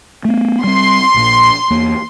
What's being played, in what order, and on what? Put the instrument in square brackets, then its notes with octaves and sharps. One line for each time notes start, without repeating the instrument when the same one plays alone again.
[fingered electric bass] A3 B3
[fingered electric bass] G3 C4 [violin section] C6
[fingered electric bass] A#1 A#2
E2 A#3